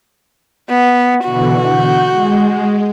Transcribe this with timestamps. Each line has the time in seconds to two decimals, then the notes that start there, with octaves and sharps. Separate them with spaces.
0.70 B3
1.25 B2 D3 E3 F#4
1.66 G6
2.11 G#3